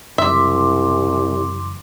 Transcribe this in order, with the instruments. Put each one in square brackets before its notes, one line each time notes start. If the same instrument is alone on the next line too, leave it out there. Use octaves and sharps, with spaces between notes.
[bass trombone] C2 [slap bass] F#2 C#3 E3 [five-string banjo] E5 [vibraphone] C6 D6